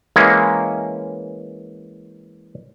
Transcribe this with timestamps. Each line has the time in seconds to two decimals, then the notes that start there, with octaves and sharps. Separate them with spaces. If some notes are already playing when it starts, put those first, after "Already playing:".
0.16 E3 G#3 A#3 C#4